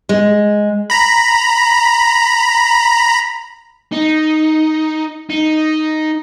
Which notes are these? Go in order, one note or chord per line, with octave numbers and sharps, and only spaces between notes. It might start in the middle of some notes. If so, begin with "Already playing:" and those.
G#3
A#5 B5
D#4
D#4